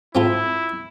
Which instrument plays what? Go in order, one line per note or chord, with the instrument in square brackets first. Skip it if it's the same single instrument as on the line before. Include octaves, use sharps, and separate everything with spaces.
[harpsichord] C4 F4 A4 [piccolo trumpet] E4